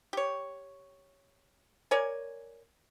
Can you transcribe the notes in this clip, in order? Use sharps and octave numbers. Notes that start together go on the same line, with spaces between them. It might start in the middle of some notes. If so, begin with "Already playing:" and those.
G4 C#5
A#4 C#5 D5 G#5